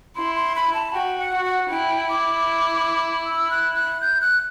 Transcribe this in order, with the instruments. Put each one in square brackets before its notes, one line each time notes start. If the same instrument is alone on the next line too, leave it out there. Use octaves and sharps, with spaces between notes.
[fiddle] E4 [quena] C6
[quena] C6
B5
A5
[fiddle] F#4 [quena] G5
[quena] F#5
[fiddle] F#4
[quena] F#5
[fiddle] E4 [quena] G5
[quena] D6
E6
F#6
F#6
G6
F#6